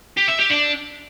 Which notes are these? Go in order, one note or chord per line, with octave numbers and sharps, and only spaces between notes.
G4
E5
G4
D4